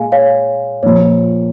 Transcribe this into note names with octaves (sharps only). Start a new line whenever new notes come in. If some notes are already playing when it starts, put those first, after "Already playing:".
Already playing: A#2 G#3 F5 G#5
C#5 F5
A#1 A#2 F3 A#3 C#5